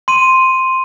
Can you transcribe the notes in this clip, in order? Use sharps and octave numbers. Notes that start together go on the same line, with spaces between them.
C6 D#7